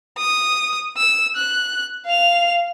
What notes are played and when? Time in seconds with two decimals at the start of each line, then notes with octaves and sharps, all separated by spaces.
0.18 D#6
0.97 E6
1.36 F#6
2.06 F5 F7